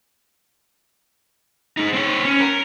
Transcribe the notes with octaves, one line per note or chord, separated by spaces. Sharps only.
G#3 D#4
C4 C#5
C#4
A#4